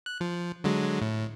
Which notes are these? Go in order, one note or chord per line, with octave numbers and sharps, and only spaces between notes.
F#6
F3
D3 F#3 G#3
A2